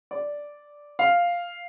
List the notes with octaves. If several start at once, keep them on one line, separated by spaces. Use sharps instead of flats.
D5
F5